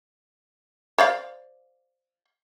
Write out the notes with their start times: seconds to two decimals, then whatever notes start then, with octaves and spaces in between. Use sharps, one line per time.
0.98 C5 D5 F5